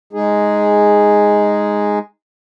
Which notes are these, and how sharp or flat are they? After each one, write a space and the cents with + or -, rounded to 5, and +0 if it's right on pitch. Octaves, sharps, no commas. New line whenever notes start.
G#3 +0 D#4 +0 G#4 +0